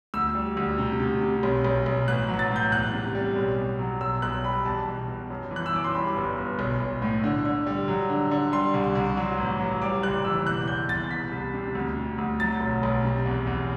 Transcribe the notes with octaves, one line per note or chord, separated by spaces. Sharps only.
D2 E6
G3
D2
C3
C3
C3
B1
B1
B1
A1 F#6
F#3
A6
A2
G6
E2 F#6
C3
G3
B1
B2
F#3
B1 E6
B1 F#6
G3 B5
E2 A5
B2
B2
F#2
E3
F#6
E6
F#2 D6
C6
G3 B5
G1
G1
B1
B1
A2
D3
D3
G3
F#3
D3
D3
G3 C6
C2
C2
F#3
A1
F#3
G3 D6
F#1 F#6
E3 E6
B2 F#6
E2 G6
E2 A6
C2 B6
C2
C3
D2
C3
D2
F#3 A6
B1
B1
C3
E2
E2